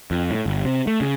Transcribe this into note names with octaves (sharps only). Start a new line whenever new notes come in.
F2
A2
G1
C3
A3
C#3